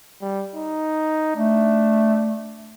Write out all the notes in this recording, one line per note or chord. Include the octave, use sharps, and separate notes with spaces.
G3
D#4
A3 D4